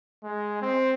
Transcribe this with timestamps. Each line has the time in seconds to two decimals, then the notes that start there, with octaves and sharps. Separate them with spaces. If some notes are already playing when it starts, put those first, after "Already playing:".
0.24 G#3
0.62 C4